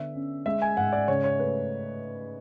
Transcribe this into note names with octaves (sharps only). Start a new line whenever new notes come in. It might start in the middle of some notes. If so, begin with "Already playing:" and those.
Already playing: D3 B3 E5
C#4
G#3 E5
G#5
G#2 F#5
D5
C#3 C#5
C#5
A3 B4